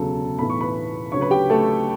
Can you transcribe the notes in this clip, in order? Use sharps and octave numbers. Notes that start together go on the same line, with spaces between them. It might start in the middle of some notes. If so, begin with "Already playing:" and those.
Already playing: E1 D2 C#3 F#3 A4
B1 A2 E3 B5
C#6
B4 B5
D2 C#3 F#3 C#5 C#6
B4 B5
G4 G5
A3 A4